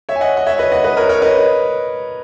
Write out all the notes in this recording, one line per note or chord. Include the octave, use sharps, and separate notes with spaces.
C#5 E5
G#5
D#5 F#5
D#5
C#5 E5
B4 D#5
D#5 F#5
B4 D#5
A#4 C#5
A#4 C#5
B4 D#5